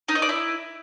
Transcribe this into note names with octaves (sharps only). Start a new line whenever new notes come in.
D#4
D#5
D5
E4